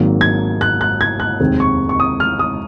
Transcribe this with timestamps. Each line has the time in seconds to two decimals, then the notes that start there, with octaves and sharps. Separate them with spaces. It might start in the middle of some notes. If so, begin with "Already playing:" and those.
Already playing: G#1 G#2 D#3 F#3 A#3
0.21 G#6
0.61 F#6
0.81 F#6
1.01 G#6
1.20 F#6
1.40 F1 D#2 D#3 G#3 C4
1.60 C#6
1.89 C#6
2.00 D#6
2.20 F6
2.39 D#6